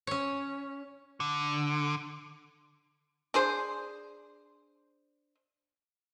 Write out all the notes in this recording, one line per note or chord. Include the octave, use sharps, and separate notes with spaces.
C#4 C#5
D3
D4 G#4 C5